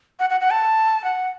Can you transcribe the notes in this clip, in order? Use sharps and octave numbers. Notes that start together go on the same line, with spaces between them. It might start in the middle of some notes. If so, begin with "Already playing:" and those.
F#5
F#5
F#5
A5
F#5